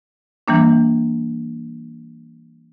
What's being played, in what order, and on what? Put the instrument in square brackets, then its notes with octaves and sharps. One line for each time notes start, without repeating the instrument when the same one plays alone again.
[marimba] E3 G3 A#3 D4